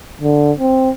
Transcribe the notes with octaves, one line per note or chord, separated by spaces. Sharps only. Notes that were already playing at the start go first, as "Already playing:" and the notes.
D3
C4